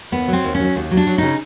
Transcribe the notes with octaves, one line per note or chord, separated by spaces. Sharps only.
D#2 B3
F#3
C4
D#2
C#4
F#3
D#2
F#3
D4
F#3
C#3 D#4